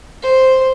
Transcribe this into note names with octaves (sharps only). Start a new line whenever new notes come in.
C5